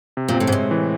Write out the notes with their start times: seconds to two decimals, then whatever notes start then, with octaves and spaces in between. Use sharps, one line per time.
0.17 C3
0.28 A#2
0.34 C4
0.40 A2
0.47 G#2
0.52 A2 G#3
0.71 E3